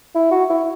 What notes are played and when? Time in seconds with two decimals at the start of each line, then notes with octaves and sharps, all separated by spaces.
0.15 E4
0.31 F#4
0.50 E4